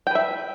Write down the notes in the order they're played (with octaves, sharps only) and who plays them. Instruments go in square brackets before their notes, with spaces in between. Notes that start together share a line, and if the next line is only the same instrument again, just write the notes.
[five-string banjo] G5
B4
E5